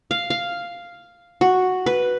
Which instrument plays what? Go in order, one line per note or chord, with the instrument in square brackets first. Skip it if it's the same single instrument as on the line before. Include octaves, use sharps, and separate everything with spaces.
[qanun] F5
F5
F#4
B4